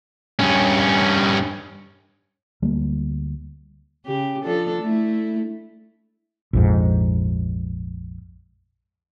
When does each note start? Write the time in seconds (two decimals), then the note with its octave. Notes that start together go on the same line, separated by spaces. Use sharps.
0.39 G2 C#4
2.62 D2 F#3 G3 A#3
4.06 C#3 G4
4.43 F3 D4 A4
4.82 A3 E4
6.53 A#1 F2 G#2